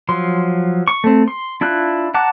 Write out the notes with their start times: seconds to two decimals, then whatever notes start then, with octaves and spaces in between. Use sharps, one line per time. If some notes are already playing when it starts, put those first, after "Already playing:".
0.09 F3 F#3 C6
0.88 C#6
1.04 A3 C4
1.28 C6
1.61 D4 E4 F4 F#6
2.14 F#5 A5 A#5 D6 F#6